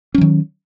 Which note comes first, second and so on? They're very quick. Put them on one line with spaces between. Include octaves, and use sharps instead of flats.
C#4 F#3 D#3